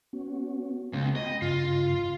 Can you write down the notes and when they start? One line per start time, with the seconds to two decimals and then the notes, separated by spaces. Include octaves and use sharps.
0.13 B3 C#4 F#4
0.93 C#2 B3 C#4
1.16 D#5 G5 B5
1.42 G2 C#3 F4